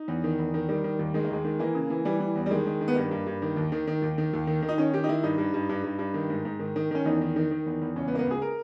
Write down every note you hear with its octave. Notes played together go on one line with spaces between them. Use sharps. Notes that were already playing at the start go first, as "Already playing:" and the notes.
Already playing: D#4
E2
D#3
E2
D#3
D#3 G3
D#3
D#2
D#3 G#3
A#3
D#2 G#3
D#3
E3 A#3
C#3
E3
E3 G3
E3
E2
G3
D#3 G#3
D#3
D#3
B3
G2 A#3
G2
G2
D#3
D#2
D#3
D#3
D#2
D#3
D#2
D#3
D#3
D#4
D#3 C#4
D#3 G4
D#4
D#3 E4
G2 D#4
G2
G2
G2
G2
G2
D#3
G#2
G#2
D#3
D#3
D#3 C#4
E2 D#4
D#3
D#3
D#3
E2
E2
C#2 C#4
B3
C#2 A#3
B3
C#2 G#4
A#4